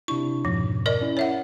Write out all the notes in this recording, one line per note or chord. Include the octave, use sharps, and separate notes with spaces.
C3 D4 E4 C#6
F2 G#2 B2 F3
A#4 D5 D#5
C#4 E4
C#5 E5 F#5